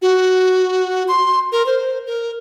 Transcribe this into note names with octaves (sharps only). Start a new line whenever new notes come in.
F#4
C6
A#4
C5
A#4